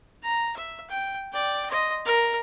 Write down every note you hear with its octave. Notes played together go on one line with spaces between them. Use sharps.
A#5
E5
G5
D5 G5
D#5 C6
A#4